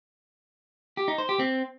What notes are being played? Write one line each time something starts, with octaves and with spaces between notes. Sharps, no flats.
G4
D#4
C5
G4
C4